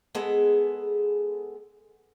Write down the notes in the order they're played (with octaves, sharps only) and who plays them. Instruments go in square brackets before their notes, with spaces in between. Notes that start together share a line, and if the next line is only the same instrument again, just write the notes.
[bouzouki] G#3 B3 G#4 A4